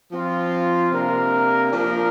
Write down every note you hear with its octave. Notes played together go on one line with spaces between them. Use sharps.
F3 C4 F4
C3 A#3 D4 A#4
F3 A#3 D4 A#4